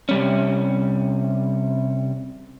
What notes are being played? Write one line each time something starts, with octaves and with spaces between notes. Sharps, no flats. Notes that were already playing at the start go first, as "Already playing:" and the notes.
C3 G3 C#4